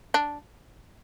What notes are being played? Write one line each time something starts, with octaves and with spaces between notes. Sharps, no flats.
D4